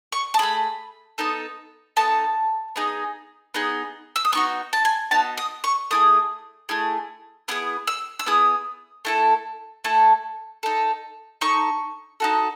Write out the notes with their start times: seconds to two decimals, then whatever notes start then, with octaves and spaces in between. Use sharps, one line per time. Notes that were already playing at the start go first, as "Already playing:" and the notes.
0.12 C#6
0.34 A5
0.39 A3 C#4 G#4 B5
1.18 B3 D#4 A4
1.96 B3 D#4 A4 A5
2.76 B3 D#4 G#4
3.54 B3 D#4 G#4
4.16 E6
4.25 D#6
4.32 B3 D#4 F#4 C#6
4.73 A5
4.85 G#5
5.11 B3 D#4 F#4 A5
5.38 D#6
5.64 C#6
5.91 A3 E4 G#4 D#6
6.69 A3 E4 G#4
7.48 B3 E4 G#4 D#6
7.87 E6
8.19 E6
8.26 B3 E4 G#4 D#6
9.05 A3 E4 A4
9.84 A3 E4 A4
10.63 D#4 A4
11.41 D#4 A4 C#6
12.20 D#4 F#4 A4